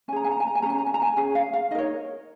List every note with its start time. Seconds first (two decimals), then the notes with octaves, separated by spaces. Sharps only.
0.08 C#4 G#5
0.12 G#4 A#5
0.25 G#5
0.31 A#5
0.40 G#5
0.47 A#5
0.55 G#5
0.62 G#4 A#5
0.66 C#4 G#5
0.78 A#5
0.86 G#5
0.94 A#5
1.02 G#5
1.17 C#4 G#4 G#5
1.35 F5
1.53 F5
1.71 D#4 D#5
1.75 A#4 C#5